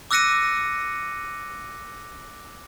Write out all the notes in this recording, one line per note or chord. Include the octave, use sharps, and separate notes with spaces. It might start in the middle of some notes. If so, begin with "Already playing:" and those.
D6 E6 F#6 A#6 C#7 D#7